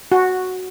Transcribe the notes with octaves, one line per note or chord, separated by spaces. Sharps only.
F#4